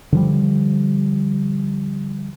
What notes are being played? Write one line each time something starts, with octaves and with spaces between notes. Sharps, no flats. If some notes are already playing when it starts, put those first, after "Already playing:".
D3 F3 G3